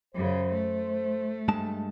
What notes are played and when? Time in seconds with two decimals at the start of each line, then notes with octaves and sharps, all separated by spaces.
0.15 F#2 C#3 C5
0.53 A3
1.48 G2 G#3 A5